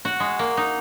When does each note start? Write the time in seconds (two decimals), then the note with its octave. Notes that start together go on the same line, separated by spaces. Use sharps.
0.05 F#4
0.20 G#3
0.39 A#3
0.57 D#4